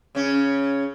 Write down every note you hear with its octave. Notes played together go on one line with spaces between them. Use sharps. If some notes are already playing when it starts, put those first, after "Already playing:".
C#3 C#4